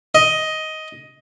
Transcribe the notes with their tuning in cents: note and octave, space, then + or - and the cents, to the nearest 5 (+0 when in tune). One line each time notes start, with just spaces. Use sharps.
D#5 +10